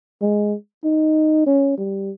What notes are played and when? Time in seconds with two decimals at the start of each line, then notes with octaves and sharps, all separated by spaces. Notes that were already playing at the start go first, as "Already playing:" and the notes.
0.21 G#3
0.84 D#4
1.47 C#4
1.78 G3